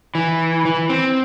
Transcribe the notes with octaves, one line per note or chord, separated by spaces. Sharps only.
E3
E3
C4